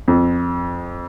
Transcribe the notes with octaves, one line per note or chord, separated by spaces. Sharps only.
F2